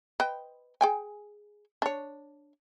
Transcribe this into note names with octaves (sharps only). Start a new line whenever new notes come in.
B4 D#5 G5
G#4 G5 G#5
D4 C#5